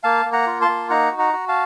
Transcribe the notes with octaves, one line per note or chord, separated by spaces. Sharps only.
A#3 F5 A5
A#3
F#5 A#5
F4
A5 C6
A#3
D#4 F#5 A#5
F#4
F#5 A#5
F#4
F5 A5